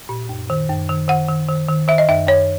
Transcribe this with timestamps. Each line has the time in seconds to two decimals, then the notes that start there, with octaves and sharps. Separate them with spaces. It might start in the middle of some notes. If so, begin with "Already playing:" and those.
0.09 A#2
0.29 F#2
0.50 D#3
0.69 F#2
0.89 D#3
1.08 D#3 F#5
1.29 D#3
1.48 D#3
1.69 D#3
1.88 D#3 E5
1.98 D#5
2.09 F#2 E5
2.27 F#2 C#5